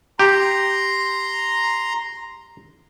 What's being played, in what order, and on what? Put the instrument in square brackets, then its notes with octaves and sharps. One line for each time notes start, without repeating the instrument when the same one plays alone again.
[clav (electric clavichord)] G4 [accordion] A#5 C6